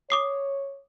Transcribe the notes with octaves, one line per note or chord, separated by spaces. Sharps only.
C#5 D6 D#6 C7